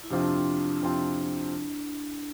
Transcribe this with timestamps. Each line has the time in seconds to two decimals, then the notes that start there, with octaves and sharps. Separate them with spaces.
0.04 E4
0.11 F2 C3 F3 C4 D4 F4
0.82 F2 C3 F3 C4 F4